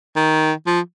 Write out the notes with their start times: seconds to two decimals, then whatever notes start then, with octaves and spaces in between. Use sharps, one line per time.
0.16 D#3
0.66 F3